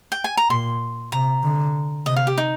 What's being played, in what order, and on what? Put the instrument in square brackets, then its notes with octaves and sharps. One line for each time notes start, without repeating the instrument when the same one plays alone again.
[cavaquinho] G5
G#5
A#5
[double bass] A#2 [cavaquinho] C6
[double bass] C3 [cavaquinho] A#5
[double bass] D3
[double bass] C3 [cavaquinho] D#5
[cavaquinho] F5
G4
D#4